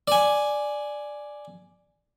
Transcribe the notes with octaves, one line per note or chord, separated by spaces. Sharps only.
D5 G#5